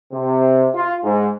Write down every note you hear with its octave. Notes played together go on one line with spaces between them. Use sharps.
C3
F4
G#2